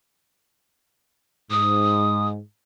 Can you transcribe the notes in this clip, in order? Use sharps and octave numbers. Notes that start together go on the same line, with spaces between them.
G#2 D#6